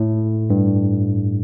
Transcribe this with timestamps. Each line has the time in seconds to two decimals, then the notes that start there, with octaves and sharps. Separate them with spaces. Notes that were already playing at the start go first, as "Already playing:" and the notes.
Already playing: A2
0.50 G2